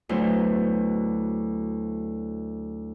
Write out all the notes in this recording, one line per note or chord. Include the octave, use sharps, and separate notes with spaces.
D2 F#3 B3 E4 C5